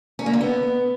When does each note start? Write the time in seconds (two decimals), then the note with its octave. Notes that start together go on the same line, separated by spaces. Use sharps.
0.19 C#4
0.26 A#3
0.33 D3
0.41 B3